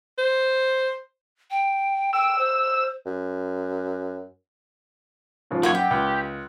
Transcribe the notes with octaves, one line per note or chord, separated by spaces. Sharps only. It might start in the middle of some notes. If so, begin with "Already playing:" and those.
C5
G5
G5 E6
C5
F#2
G#2 C#3 F3
F#2 F3 A#3 B3 C#5
G4 G5
C#2